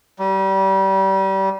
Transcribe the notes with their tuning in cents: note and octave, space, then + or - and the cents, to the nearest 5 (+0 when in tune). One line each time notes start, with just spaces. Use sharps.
G3 -25